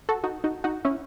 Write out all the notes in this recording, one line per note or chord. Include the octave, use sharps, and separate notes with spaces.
F#4 A4
D#4 F#4
D#4 F#4
D#4 F#4
C#4 E4